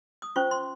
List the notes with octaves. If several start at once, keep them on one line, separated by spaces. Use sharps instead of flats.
D#6
C#4 F4 C5 C#6
C6